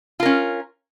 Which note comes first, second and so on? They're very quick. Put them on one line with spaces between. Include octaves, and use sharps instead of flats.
F4 A#4 C#4